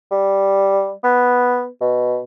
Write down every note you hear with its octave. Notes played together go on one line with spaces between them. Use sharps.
G3
B3
B2